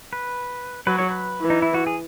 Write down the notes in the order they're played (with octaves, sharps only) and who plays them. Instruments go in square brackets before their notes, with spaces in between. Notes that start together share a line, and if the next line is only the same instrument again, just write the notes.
[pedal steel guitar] B4
[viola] F#3 [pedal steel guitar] B4
[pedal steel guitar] C#5
B4
[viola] E3
[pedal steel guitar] D#4
E4
F#4
G#4